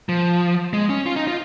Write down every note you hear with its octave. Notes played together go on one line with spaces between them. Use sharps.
F3
G#3
C#4
F4
D#4
F4